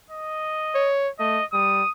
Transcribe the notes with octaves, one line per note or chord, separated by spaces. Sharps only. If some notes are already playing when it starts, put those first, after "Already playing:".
D#5
C#5
A3 D#5
G3 D#6